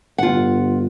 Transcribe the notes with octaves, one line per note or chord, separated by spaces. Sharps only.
G1 F4 F#5